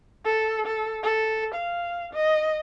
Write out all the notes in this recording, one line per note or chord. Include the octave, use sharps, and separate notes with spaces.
A4
A4
A4
F5
D#5